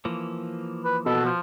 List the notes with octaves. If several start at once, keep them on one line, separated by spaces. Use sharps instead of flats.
E3 F3 A#3
B4
B2 A4
F3